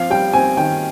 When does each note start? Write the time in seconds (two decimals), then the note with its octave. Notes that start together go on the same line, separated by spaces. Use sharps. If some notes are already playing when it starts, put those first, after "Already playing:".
Already playing: F3 C4 F5
0.10 G3 G5
0.33 C4 G#5
0.57 D#3 G5